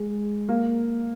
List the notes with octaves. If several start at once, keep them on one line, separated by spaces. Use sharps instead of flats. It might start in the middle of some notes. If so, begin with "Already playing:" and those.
Already playing: G#3
A#3